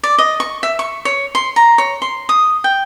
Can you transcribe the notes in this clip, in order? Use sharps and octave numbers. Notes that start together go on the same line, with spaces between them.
D5
D#5
C#6
E5
C#6
C#5
C6
A#5
C#5
C6
D#6
G5